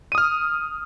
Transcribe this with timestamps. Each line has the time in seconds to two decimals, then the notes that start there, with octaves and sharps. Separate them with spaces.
0.12 D#7
0.15 D#6
0.18 F6